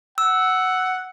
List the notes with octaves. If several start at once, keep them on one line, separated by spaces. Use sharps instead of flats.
F#5 E6